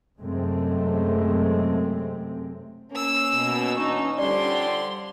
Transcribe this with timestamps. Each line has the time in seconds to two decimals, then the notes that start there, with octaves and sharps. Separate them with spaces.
0.20 F#2 C3 G#3 A3 C4
2.92 A#3 C#4 E6
3.33 B2
3.77 E3 D4 D#4 C#6
4.18 D3 F3 G3 D5 C6